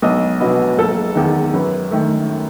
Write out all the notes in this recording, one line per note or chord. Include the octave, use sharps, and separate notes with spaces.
B1 D#5
B2 F#3 B3 D#5
F#1 A4
E2 D#3
F#2 B4
D#3 A3